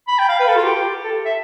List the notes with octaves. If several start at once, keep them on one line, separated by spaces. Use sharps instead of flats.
B5
G5
F5
B4
A4
F4
G4
A4
E5